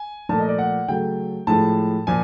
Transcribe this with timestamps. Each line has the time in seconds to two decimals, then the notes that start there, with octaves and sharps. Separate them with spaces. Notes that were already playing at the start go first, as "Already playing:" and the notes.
Already playing: G#5
0.29 A#2 F3 A3 A5
0.39 D#5
0.49 D5
0.59 F#5
0.88 C#3 F#3 A3 G5
1.47 A2 F3 G#3 A5
2.07 A#2 F3 G#5